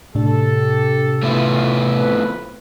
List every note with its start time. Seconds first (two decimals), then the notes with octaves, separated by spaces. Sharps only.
0.15 A2 C3 D4 G4 A4
1.23 B1 A3 B3 E4 F4
1.96 F3 C4 B4